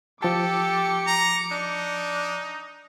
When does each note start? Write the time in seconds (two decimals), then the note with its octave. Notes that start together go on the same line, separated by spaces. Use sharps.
0.23 F3 G4 A4 A5 D6 C#7
1.07 A#5
1.51 D4 D#4